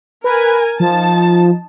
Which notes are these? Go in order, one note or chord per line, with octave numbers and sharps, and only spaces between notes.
A#4 B4 G#5
F3 D#4 A5